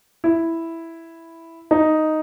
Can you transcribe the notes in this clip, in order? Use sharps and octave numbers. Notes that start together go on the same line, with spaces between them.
E4
D#4